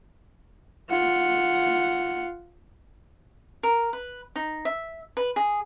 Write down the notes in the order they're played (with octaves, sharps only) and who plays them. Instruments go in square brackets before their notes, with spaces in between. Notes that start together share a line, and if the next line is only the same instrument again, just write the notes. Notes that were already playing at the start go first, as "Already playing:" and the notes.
[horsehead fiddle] F4 F#5
[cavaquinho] A#4
B4
D#4
E5
B4
G#4